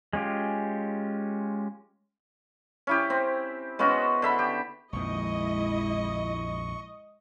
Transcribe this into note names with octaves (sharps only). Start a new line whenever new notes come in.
G#3 C#4 F4 G4
C#4 E4 G4
C4
G#3 B3 C#4 F#4
D3 E5 B5
G4
A#1 F2 D#3 G#3 E4 D#5 C#6